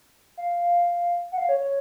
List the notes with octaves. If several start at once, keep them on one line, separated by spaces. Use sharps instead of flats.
F5
F#5
F5
C#5
C#5